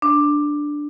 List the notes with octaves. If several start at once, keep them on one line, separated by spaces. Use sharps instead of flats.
D4